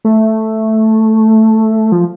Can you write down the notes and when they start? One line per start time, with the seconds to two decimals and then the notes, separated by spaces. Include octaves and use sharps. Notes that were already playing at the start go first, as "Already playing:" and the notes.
0.05 A3
1.92 F3